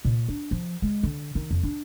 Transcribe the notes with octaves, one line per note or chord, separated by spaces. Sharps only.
A#2
D4
F3
G#3
D3
D#3
F2
D4